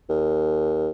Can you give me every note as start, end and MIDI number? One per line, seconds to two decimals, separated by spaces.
0.10 0.91 39